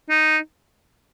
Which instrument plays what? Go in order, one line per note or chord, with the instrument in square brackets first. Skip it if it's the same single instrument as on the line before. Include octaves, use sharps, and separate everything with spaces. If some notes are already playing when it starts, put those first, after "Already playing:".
[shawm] D#4